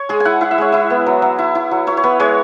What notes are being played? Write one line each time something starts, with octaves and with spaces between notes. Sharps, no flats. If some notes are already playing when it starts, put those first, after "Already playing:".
Already playing: C#5
G#3 G#4
G#5
E4 F#5
E4 F#5
E5
G#3 C#5
E4 E5
B3
F#3
F#3
E4
E4
F#3
E4 C#5
C#5
B3 B4
G#3 C#5